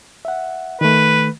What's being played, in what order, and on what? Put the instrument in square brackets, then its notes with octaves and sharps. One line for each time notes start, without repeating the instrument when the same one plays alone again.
[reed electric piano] E5 F#5
[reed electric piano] D#3 A3 [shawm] B4